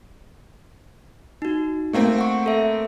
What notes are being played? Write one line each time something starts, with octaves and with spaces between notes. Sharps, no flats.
D#4 F#4
A3 A#3 C4
F#5 C#6
A4 E5